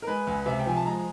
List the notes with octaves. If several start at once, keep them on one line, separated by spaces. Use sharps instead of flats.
A#4
G#3 B4
C#2
C3 E5
G5
F3 G#5
A5
G#3 A#5